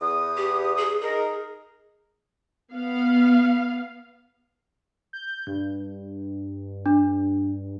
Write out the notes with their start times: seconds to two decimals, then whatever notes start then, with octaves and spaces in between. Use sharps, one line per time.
0.01 E2 D#6
0.37 G4
0.77 G#4
1.01 D#4 G#4 A#4
2.73 B3 F5
5.13 G6
5.47 G2
6.86 D4